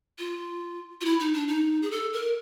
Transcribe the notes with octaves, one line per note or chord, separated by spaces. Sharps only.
F4
F4
E4
D#4
D4
D#4
G#4
A4
A#4